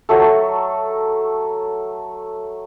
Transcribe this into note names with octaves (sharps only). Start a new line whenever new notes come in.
F#3 A3 A4